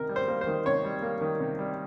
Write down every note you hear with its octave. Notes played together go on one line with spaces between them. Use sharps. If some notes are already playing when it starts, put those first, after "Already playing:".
Already playing: C3 D#3 A#4
G3
C5
A#3
C5
D#3
C3 C#5
G3
A#3
D#3
C3
G3